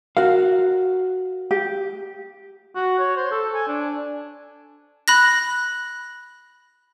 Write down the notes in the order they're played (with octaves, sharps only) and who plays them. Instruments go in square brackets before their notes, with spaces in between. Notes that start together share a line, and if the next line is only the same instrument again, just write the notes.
[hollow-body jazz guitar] F#4 A#4 F5
[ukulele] G4
[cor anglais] F#4
C#5
C5
A4
G#5
D4
[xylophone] B5 F#6 A#6